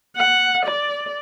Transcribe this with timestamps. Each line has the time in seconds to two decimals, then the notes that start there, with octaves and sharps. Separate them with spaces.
0.17 F#5
0.65 D5